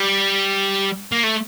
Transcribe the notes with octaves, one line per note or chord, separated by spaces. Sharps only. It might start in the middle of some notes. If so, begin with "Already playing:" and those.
Already playing: G3
A#3
A3